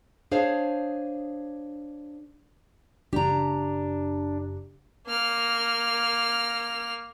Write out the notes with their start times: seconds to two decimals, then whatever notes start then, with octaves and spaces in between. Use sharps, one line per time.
0.31 D4 G#4 C5 C#5 F5
3.13 F#1 D4 G4 A#5
5.07 A#3 F6